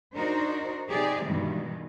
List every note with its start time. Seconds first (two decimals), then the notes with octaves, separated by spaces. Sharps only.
0.15 D4 D#4 F#4 A#4 C5
0.89 C3 D#4 G4 G#4 D5
1.25 G2 B2 D#3 E3 G3 G#3